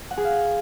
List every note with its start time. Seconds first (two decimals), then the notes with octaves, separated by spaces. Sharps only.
0.11 F#5
0.17 G#4
0.24 F5